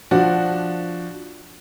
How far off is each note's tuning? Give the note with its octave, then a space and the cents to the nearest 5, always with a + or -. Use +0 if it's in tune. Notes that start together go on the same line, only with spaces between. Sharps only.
F3 +0 D4 +0 F#4 +0